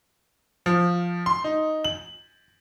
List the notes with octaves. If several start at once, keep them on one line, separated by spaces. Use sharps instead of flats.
F3
C6
D#4
F#7